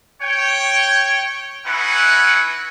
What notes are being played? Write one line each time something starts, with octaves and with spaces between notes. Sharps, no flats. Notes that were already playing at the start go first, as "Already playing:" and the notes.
C#5 G5
C#4 D#4 E4 B4 F#5